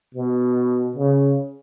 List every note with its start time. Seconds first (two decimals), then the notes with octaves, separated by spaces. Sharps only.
0.14 B2
0.96 C#3